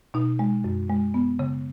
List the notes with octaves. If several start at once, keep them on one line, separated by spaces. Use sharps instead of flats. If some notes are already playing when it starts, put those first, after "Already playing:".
B2 D#4
G#3
F#2
G#3
B3
C#3